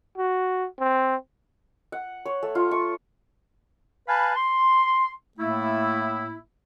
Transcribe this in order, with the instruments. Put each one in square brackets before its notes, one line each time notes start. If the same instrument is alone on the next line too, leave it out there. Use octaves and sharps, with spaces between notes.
[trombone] F#4
C4
[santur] F#5
C#5
A3
F4
C#6
[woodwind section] B4 F5 G#5 A5 B5
C6
A2 A3 A#3 E4